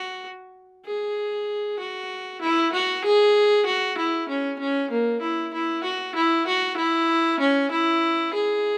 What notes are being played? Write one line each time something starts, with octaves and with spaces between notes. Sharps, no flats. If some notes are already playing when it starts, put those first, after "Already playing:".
Already playing: F#4
G#4
F#4
E4
F#4
G#4
F#4
E4
C#4
C#4
A#3
E4
E4
F#4
E4
F#4
E4
C#4
E4
G#4